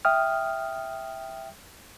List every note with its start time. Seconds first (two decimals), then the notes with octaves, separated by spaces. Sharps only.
0.05 E5 G5 D#6 F6